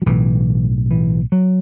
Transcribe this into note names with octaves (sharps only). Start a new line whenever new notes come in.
F#3
B1 A2 E3
E3
F#3